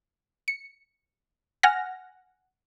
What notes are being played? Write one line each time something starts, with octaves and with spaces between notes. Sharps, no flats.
C#7
F#5 G#5 F6 A#6